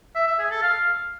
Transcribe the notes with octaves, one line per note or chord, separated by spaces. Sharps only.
E5
E5
G#4
A4
F5